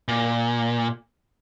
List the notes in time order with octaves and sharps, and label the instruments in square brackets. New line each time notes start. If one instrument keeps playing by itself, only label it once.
[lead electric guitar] A#2